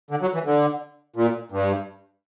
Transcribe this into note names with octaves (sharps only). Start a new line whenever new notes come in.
D3
F#3
E3
D3
A#2
G2